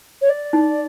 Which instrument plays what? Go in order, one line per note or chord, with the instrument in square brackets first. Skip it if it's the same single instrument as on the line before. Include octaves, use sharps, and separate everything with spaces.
[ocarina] C#5
D5
[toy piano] D#4